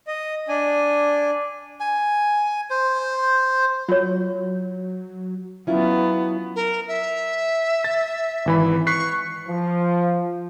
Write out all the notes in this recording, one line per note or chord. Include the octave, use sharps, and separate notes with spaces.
D#5
D4 G#5
G#5
C5
F#3 F4 C#5
F#3 B3 C#4 E4 F4
A#4
E5
A6
G#1 E3 B5
C#6 F#6 B6 C7
F3